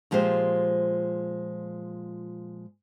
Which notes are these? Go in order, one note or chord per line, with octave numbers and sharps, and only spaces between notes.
A#2 F3 G#3 G4 C5